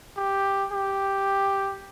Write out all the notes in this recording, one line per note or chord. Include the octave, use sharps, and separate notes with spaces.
G4
G4